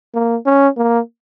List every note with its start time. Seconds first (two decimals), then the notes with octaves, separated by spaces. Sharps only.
0.14 A#3
0.46 C#4
0.77 A#3